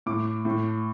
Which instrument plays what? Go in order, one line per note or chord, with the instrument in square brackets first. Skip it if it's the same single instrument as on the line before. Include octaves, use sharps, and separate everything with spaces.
[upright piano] A2 D6
A2